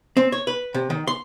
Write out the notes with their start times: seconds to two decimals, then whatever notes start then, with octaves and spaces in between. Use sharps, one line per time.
0.17 C4
0.32 C#5
0.47 B4
0.74 C3
0.90 D#3
1.07 C6